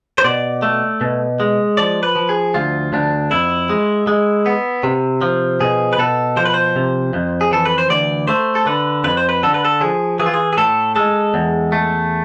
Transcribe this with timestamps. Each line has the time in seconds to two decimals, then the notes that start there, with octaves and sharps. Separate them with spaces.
0.18 C5
0.24 B2 D5
0.62 A3
1.01 B2
1.40 G#3
1.77 F3 D5
2.03 B4
2.15 F3
2.29 G#4
2.54 D2 F4
2.93 D2 D4
3.31 F2 E4
3.69 G#3
4.07 G#3
4.46 B3
4.83 C3
5.21 F3
5.60 B2 G#4
5.93 B4
5.98 B2 A4
6.36 F3 C5
6.45 B4
6.54 C5
6.76 C3
7.13 F2
7.41 G#4
7.51 E3 A4
7.65 B4
7.78 C5
7.90 D2 D5
8.28 A3 C5
8.55 A4
8.66 D3 B4
9.04 F2 B4
9.17 C5
9.29 B4
9.43 D3 A4
9.54 B4
9.65 A4
9.81 F3 G#4
10.19 E3 G#4
10.26 F4
10.34 G#4
10.53 G#4
10.57 A2 A4
10.96 G#3 A4
11.34 E2
11.72 A3